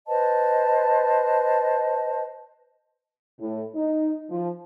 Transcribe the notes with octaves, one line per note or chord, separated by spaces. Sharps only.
B4 C5 D#5 A5
A2
D#4
F3